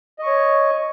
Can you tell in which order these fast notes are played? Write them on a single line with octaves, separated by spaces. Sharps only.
D#5 C#6 C#5